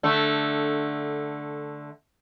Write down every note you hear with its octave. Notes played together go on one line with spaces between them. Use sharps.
D3 A3